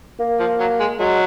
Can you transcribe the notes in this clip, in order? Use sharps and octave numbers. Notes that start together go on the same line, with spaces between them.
A#3
F3
F#3
G#3
F#3 G#3